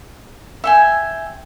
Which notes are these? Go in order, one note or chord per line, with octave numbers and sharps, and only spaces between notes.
E5 G5 G#5